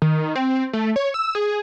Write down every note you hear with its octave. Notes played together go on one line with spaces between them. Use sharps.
D#3
C4
A3
C#5
E6
G#4